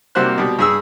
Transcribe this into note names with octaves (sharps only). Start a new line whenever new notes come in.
C3 G3 A#3 F#4 C5 F#6
B2 G3
G2 G#4 E6